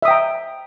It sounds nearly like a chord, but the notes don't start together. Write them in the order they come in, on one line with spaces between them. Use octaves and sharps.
E5 D#6 G5 A#5